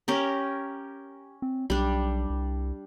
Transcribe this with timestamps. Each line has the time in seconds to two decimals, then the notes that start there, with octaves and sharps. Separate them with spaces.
0.08 C#4 G4 A#4
1.42 C4
1.70 B1 G3 D4
2.30 C2